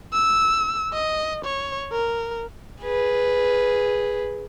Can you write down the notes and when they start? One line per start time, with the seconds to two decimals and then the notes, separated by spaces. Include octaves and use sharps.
0.13 E6
0.93 D#5
1.45 C#5
1.93 A#4
2.82 G#4 B4